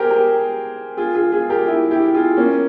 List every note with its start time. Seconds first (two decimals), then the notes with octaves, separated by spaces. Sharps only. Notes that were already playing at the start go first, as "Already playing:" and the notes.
Already playing: G4 G#4 A#4 C5
0.10 G4 A#4
0.97 F4 G#4
1.15 F4 G#4
1.32 F4 G#4
1.50 G4 A#4
1.67 E4 G4
1.91 E4 G4
2.14 F4 G#4
2.37 A#3 C#4